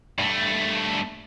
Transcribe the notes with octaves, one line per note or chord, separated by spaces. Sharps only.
G2 A3